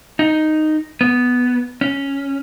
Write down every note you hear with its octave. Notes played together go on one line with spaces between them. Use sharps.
D#4
B3
C#4